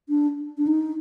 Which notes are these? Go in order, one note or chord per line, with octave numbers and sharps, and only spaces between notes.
D4
D4
D#4